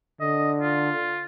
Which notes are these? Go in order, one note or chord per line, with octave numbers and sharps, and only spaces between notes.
D3 D#5
F4